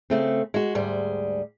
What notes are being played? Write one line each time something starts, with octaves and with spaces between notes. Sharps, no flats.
C#3 A3 C4
G#3 F#4
D2 G#2 G3 G#4